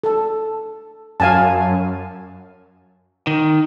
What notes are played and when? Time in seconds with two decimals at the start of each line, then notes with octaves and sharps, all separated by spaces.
0.04 A4 A5
1.20 F#2 F5 G#5 A5
3.27 D#3